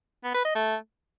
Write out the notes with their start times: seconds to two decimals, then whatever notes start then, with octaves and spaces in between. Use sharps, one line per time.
0.24 B3
0.34 B4
0.45 D#5
0.55 A3